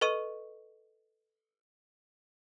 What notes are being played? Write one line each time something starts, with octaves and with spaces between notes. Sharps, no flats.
A4 B4 D#5 C#6 D#7